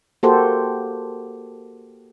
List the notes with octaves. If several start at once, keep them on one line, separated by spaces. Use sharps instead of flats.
A#3 F#4 G4 A4 C5